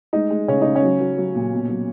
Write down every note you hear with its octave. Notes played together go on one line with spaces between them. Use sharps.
G#3 D#4
G#3
C#3 C#4
C#3 D#4
C#4
F#3
F#3
F#3
A#2
B2
F#3